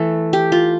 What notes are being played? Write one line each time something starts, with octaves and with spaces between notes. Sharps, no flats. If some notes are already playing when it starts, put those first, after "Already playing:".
Already playing: E3 A3 A4
G4
F4